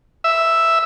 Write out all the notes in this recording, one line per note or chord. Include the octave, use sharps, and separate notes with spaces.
E5